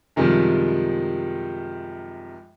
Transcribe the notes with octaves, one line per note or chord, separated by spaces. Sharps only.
F#2 C3 D#3 F3 G3 G#3